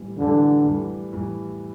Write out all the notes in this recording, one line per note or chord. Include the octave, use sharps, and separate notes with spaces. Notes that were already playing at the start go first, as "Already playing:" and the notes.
Already playing: A2 E3 G3
A2 D3 E3 G3
A2 E3 G3
A2 E3 G3